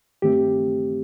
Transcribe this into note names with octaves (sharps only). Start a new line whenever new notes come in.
G2 D#3 A3 C4 G4